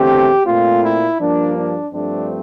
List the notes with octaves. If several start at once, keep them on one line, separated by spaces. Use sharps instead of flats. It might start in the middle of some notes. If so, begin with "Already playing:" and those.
Already playing: E2 D3 A3 C4 G4
A#2 A3 C4 F4
E4
G2 F3 A#3 D4
D4
G2 F3 A3 C4 D4